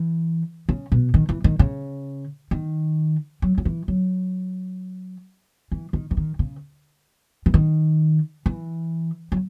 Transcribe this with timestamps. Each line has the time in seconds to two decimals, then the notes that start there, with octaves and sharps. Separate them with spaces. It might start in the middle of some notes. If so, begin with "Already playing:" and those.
Already playing: E3
0.69 C#3
0.92 B2
1.14 D#3
1.29 E3
1.44 D#3
1.59 C#3
2.51 D#3
3.42 F#3
3.58 F#3
3.65 E3
3.88 F#3
5.72 E3
5.93 D#3
6.11 E3
6.17 D#3
6.39 C#3
7.46 E3
7.54 D#3
8.46 E3
9.32 F#3